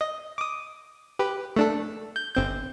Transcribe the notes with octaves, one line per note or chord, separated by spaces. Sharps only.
D#5
D6 D#6
G4 B4
A3 D4 A4
G6
G1 C4 G6